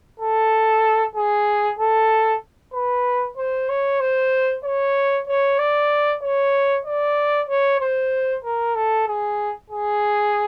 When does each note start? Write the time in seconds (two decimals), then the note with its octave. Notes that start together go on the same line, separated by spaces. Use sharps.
0.20 A4
1.16 G#4
1.79 A4
2.73 B4
3.37 C5
3.69 C#5
4.00 C5
4.64 C#5
5.27 C#5
5.59 D5
6.22 C#5
6.85 D5
7.49 C#5
7.80 C5
8.45 A#4
8.75 A4
9.08 G#4
9.70 G#4